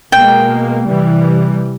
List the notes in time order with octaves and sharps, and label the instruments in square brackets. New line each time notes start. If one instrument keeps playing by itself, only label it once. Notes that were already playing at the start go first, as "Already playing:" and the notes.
[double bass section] B2 G#3 A#3 [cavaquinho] G5
[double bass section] C3 E3 G3